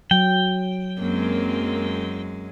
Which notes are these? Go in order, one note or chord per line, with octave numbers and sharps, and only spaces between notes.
F#3 G5
F#2 G#3 A#3 C4